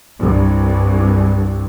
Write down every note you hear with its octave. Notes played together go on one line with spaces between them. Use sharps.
C2 G2